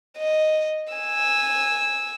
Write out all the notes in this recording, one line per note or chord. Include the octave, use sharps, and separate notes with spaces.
D#5
G#5 E6